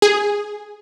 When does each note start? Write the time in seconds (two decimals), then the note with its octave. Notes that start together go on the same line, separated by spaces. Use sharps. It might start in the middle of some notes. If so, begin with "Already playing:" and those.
0.02 G#4